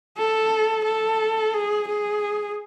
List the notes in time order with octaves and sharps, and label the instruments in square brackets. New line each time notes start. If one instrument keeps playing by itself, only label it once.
[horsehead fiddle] A4
A4
G#4
G#4